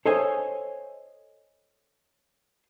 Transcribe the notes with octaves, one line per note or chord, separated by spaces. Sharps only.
A4 C5 C#5 D#5 E5 G#5